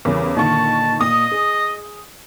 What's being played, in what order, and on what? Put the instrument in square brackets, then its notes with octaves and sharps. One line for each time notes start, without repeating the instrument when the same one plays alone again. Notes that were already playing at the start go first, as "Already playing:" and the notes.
[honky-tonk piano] E2 C#3 [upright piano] G3 B3 A#4
[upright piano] A#2 D3 [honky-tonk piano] D#3 C#6 [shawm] A5
[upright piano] A#2 [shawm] D#5 [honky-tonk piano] D#6
[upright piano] G#4